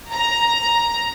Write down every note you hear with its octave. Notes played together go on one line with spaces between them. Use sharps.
A#5